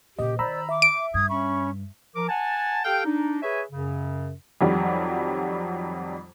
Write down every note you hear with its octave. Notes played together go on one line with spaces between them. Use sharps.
A#2 C#3 G4 D#5
D#3 C5 D5 A#5 B5 E6
E5 D6
D7
G2 D#6 G#6
C#4 B5 C#6
F3 A#4 D6
F#5 G#5 A5
G4 A4 F5 G5
D4 D#4
G#4 B4 C#5 E5 G#5
F#2 C#3
F2 D#3 F#3 G3